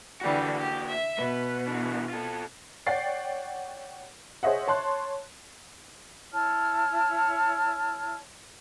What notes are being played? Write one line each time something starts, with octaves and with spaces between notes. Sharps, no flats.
D3 E3 G3 A#3 F#4
G4
E5
B2 B4
E3 D4
F4 A4
C#5 D5 F#5 G5 A6 C7
G#4 C5 C#5 D#5 E5 F#5
C#5 A5 C6 F#6
E4 C#5 A5 F6